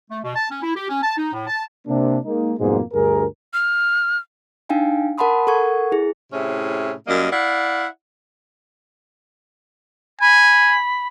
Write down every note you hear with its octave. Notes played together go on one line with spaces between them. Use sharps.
A3
B2
A5
C#4
E4
G4
C#4
A5
D#4
A2
A5
C3 A#3 D4
G#3 A#3 D#4
F2 G#2 B2 G3 G#3 A#3
D2 G2 G#4 A#4
F6
D4 D#4 F5 G5 G#5
A#4 F#5 A5 B5 C6 D#6
A4 A#4 F#5 C#6 G#6
E4 G#4
A2 C3 C#4 E4 G#4
F#2 G3 A#3 D#5
E4 D5 F5 F#5
G#5 B5